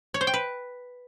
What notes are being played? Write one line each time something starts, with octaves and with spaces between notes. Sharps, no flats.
C#5
C5
G5
B4